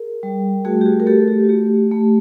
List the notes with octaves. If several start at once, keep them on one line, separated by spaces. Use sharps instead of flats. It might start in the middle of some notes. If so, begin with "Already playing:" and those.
Already playing: G#4 A#4
G3
A3 F#4 G#4
G4
F#4 G#4
A#4
A3 G4 A4
G4
F#4
A3 G4
A3